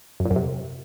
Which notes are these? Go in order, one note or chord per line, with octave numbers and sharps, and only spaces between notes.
F#2
A#2
F#2
C3